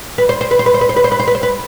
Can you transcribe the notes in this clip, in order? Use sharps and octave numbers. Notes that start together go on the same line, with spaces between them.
B4
C5
C5
B4
C5
B4
C5
B4
C5
B4
C5
B4
C5
B4
C5
B4